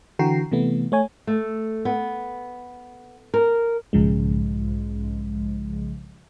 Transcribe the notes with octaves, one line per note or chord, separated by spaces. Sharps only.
D3 E3 F#4 G5 A#5 C7
C3 E3 A3 B3
A3 C#5 G#5
A3
B3
A#4
B1 G#2 C#3 F3 G#3